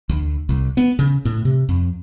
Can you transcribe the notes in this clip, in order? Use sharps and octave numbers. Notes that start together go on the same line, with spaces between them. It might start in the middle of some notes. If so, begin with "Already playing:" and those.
D2
C2
B3
C#3
A2
C3
F2